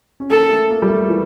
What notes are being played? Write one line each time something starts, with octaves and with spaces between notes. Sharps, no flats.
C#4
A#3 A4
A3
A#3
G3
A3
E3